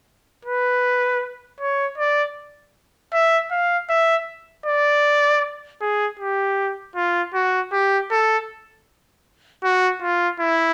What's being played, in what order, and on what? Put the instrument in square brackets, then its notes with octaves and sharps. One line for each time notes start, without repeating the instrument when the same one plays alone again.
[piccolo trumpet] B4
C#5
D5
E5
F5
E5
D5
G#4
G4
F4
F#4
G4
A4
F#4
F4
E4